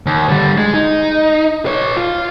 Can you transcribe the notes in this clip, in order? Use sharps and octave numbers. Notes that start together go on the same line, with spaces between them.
D#2
D3 G3
G#3
D#4
B4 C#5
F4